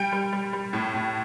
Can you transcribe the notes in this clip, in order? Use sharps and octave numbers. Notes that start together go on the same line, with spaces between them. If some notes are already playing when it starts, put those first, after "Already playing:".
Already playing: G3 G5
G3
G3
G3
A2
A2